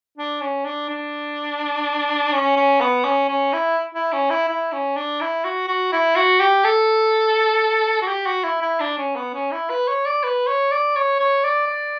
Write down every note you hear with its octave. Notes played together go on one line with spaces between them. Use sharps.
D4
C#4
D4
D4
C#4
C#4
B3
C#4
C#4
E4
E4
C#4
E4
E4
C#4
D4
E4
F#4
F#4
E4
F#4
G4
A4
F#4
G4
F#4
E4
E4
D4
C#4
B3
C#4
E4
B4
C#5
D5
B4
C#5
D5
C#5
C#5
D5
D5